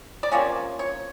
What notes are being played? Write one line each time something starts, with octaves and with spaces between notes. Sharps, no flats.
D5
C3 F3 A#3 C#4 C#5
C#5